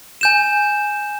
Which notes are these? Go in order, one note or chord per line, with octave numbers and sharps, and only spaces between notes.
G#5 G6 E7